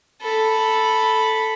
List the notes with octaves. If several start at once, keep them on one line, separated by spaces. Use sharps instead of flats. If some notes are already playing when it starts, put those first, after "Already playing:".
A4 B5